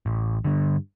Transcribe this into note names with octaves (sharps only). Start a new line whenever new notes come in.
A1
G2 D3